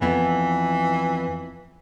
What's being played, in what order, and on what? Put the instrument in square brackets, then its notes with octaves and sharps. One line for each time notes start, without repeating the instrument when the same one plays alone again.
[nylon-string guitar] F2 B3 E4 [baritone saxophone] E3